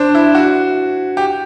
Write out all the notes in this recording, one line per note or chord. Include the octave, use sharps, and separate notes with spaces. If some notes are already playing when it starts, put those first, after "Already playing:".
Already playing: D4 C5
E4
F#4
G4